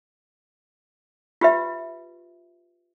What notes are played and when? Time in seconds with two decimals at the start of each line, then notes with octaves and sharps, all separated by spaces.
1.41 F4 G4 B4 E5